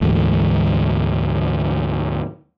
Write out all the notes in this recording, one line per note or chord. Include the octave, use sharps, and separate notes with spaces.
D2 G#2 E3